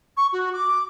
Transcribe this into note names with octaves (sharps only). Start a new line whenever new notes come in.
C#6
F#4
D6